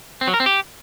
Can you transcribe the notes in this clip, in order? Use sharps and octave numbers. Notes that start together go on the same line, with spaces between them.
C4
F#3
A#4
C4
G4